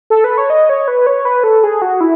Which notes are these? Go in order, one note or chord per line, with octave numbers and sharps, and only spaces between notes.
A4
B4
C#5
D#5
C#5
B4
C#5
B4
A4
G#4
F#4
E4